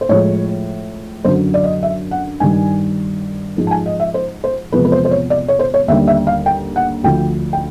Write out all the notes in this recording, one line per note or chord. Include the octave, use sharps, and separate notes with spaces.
C5
A2 F3 G#3 C#5
F#2 D3 F#3 C5
D5
D#5
E5
F#5
G2 D#3 G3 G#5
G#2 F3 G#3
A5
G#5
D#5
E5
C5
C5
E2 C3 F3 G#3 B4
B4
C5
C5
C#5
D5
C#5
C5
C#5
D#2 D3 G3 E5
E5
F5
G5
F#5
D2 D3 F3 G5
G5